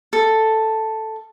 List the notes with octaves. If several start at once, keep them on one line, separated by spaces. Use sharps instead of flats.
A4